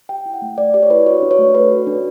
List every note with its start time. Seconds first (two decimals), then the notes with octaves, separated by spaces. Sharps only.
0.09 G4 G5
0.26 E4
0.34 F#5
0.42 A3
0.58 A3 D5
0.74 G4 D5
0.83 C#5
0.90 E4 B4
1.06 F#4 C#5
1.22 D4
1.31 C#5
1.39 A3
1.55 A4 B4
1.71 F#4
1.87 D4